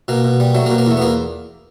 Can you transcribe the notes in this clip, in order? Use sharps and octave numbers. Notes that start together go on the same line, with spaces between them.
B2 A#3
B2
G3
F#3 A3
A#3
B2
A#3
E2 A3
B3
E2 A#3